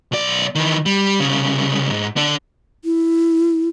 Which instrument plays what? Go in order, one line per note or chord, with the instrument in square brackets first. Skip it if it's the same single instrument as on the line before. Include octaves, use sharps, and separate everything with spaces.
[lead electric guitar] B1 D5
D#3 E3
G3
C2 C#3
G#2
D3 D4
[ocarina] E4